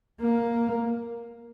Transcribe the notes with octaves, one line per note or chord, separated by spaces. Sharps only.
A#3